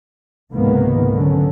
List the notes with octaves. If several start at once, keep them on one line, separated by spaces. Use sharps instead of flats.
C#2 G#2 C3 D#3 A#3 B3
D3 F#3 C#4